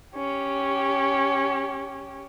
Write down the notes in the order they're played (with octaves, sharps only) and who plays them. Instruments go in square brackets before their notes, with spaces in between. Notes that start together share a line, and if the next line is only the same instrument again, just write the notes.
[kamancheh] C#4 G4